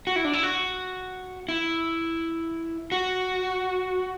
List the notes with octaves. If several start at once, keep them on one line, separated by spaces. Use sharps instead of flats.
F#4
E4
D4
E4
F#4
E4
F#4